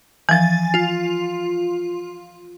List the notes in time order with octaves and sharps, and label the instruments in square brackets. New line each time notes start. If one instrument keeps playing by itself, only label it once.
[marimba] E3 F3 [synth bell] G#5 A6
[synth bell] F4